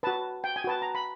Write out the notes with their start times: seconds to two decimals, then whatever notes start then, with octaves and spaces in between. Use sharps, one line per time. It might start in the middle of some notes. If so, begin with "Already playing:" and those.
0.03 F#4 B4 A5
0.44 G5
0.56 G#5
0.64 F#4 B4 A5
0.82 A#5
0.95 B5